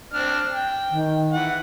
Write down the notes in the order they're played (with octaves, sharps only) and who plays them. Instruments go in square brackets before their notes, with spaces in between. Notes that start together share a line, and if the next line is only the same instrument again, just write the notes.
[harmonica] C4 D4 F6
G5
[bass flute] D#3
[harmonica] E3 F#5